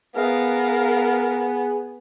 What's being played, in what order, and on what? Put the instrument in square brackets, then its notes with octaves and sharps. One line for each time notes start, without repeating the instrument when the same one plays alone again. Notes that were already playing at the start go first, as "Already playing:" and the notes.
[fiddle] B3 [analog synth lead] G#4 [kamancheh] A#4 F5